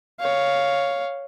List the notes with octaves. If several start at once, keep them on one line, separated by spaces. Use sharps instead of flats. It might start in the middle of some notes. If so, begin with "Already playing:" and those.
C#5 F5